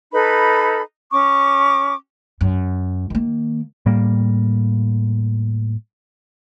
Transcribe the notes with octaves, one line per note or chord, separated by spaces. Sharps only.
D#4 A4 B4 B5
C#4 C#6 D6
F#2
D#3 A#3
A2 G3 A#3